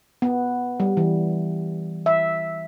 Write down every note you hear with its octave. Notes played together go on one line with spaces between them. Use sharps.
B3
G3
E3
E5